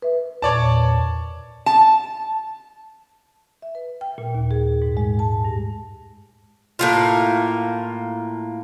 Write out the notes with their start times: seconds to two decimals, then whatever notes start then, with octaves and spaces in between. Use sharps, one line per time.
0.02 B4 E5
0.42 E2 A#2 C#5 D5 A5
1.66 A5
3.62 E5
3.75 B4
4.01 G5
4.18 A#2
4.35 D#2
4.51 G#4
4.82 G#2
4.97 G#3
5.19 A5
5.45 G2
6.79 A2 A#3 F4